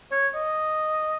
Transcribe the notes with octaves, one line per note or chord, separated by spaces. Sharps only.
C#5
D#5